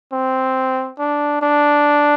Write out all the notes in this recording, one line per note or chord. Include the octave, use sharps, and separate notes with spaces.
C4
D4
D4